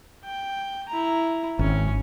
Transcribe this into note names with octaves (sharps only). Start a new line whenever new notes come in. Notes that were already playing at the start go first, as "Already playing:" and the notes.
G5
E4 A#5
G#1 C#4